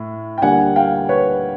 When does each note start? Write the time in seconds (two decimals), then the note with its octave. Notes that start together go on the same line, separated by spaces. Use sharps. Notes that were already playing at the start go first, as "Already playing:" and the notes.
Already playing: A2
0.38 G5
0.42 D2 D3 G3 A#3 F#5 G#5
0.76 F5 G5
1.09 B4 C#5